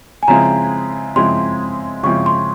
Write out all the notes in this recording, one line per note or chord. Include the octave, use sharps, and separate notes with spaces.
G#5
C#3 F3 G#3 C4 E4 A#5
C#3 F3 G#3 C4 E4 C6
C#3 F3 G#3 C4 E4 C#6
C6